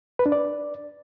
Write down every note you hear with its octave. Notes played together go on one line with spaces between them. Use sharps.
B4
D4
D5